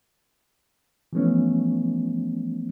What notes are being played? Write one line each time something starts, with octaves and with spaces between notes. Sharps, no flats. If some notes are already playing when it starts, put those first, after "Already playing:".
E3 F3 G3 A3 B3 C#4